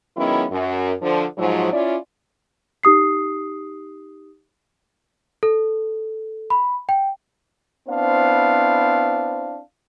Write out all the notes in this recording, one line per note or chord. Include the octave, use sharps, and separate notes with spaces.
D#3 F#3 G#3 B3 C#4 E4
F#2
D3 F3
G#2 F3 F#3
C#4 E4 F4 D5
D#4 G4 D#6 C7
A4
B5
G5
B3 C4 D4 E4 C5 F5